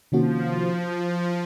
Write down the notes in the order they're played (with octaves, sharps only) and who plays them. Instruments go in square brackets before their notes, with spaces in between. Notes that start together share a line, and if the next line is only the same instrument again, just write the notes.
[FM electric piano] C3 D#3 A#3 C#4 F#4 [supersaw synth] F3